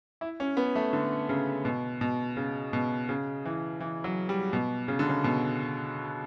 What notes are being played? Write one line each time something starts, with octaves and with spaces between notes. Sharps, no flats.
E4
C#4
B3
A3
D3
C#3
B2
B2
C#3
B2
C#3
E3
E3
F#3
G3
B2
C#3
D3
C#3
B2